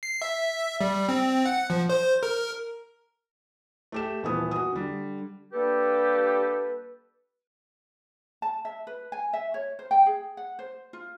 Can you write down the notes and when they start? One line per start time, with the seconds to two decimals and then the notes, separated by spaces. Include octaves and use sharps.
0.03 C7
0.22 E5
0.81 G3
1.09 C4
1.45 F#5
1.70 F3
1.90 C5
2.23 A#4
3.92 A3 G4 E7
4.23 D#1 E3 B3 D#6
4.51 F#4 D#6
4.72 D3 G3
5.53 G3 A#3 D4 G4 A4 B4
8.42 A5
8.65 E5
8.87 B4
9.12 G#5
9.33 E5
9.54 C#5
9.79 C5
9.91 G5
10.06 G#4
10.37 F#5
10.59 C5
10.93 F4